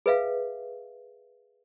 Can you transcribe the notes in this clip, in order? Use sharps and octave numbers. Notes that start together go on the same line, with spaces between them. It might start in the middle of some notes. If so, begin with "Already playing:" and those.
G#4 B4 E5 F5